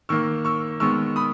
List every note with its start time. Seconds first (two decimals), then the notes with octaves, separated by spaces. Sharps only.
0.09 D#3 A#3 C#6 E6
0.45 C#6 E6
0.80 D#3 G#3 B3 C#6 E6
1.16 B5 D#6